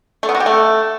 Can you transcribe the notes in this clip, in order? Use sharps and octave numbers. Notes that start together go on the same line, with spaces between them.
A3
B3
F#4
G4
A3